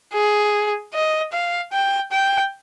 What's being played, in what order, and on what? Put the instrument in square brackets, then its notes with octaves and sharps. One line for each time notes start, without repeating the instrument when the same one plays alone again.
[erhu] G#4
D#5
F5
G5
G5